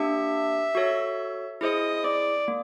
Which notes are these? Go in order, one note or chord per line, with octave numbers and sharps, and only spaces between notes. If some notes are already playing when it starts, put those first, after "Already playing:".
Already playing: A#3 D4 G4 E5
F#4 A4 C#5
E4 G#4 C5 D#5
D5
A#3